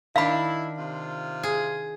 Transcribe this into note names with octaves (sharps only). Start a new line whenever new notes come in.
D#3 D4 E4 F5 B5
C3 F4
G#4